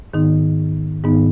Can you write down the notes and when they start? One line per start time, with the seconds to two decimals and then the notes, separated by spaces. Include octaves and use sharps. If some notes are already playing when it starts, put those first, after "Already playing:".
0.13 G#2 D#3 B3 D#4
1.04 G#2 D#3 B3 D#4